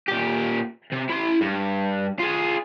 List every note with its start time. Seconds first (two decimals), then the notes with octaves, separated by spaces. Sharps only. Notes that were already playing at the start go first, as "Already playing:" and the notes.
0.08 A#2 G4
0.92 C3
1.10 E4 C6
1.41 G2
2.19 F4 G#4